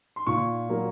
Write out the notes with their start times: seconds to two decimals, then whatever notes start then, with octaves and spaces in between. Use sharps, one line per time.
0.16 C6
0.27 A#2 C#6
0.69 F#3 A#3